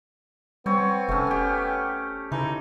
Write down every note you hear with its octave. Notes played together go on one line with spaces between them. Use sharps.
G3 B3 C4 C#5
F1 A3 C#4
C#4 G4
C#3 E3 D#4